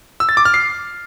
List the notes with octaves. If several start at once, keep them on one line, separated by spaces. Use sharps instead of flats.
E6
A6
D6
F6
C7